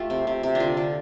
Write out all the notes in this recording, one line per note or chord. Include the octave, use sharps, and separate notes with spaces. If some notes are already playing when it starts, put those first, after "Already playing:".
Already playing: A3 F4 G4 A4
C3
C3
C3
D3 D4 F4
D3